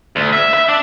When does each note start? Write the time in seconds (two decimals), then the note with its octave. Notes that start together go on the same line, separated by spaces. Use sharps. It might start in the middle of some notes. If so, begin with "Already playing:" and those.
0.16 D2
0.33 E5
0.54 E5
0.69 D4